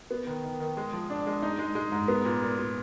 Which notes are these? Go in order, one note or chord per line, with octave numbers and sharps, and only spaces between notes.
B3
D#3
D#3
D#3
G#3
F3
D4
G#3
D#4
G#3
G#3
G#2
B3
A#2
A#2
A#2